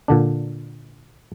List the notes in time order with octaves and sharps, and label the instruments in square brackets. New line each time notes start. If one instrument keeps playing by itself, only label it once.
[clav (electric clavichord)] A#2 D3 D4